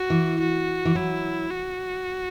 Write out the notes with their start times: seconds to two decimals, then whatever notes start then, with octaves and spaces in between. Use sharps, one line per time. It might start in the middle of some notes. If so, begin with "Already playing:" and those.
Already playing: F#4
0.10 E3
0.40 F#4
0.85 E3
0.95 F#3 E4
1.50 F#4